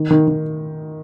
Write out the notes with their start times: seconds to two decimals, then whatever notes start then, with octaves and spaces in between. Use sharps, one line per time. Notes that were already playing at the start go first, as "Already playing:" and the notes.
Already playing: D#3
0.11 D#3
0.28 D#3